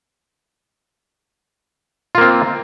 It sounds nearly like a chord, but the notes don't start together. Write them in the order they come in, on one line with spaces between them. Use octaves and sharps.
F4 A#3 C4